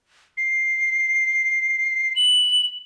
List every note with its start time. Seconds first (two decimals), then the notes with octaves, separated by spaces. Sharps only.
0.37 C7
2.16 F#7